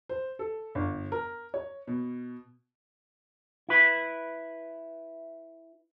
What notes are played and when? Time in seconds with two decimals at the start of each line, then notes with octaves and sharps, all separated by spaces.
0.09 C5
0.39 A4
0.75 G1
1.12 A#4
1.54 C#5
1.87 B2
3.69 E4 B4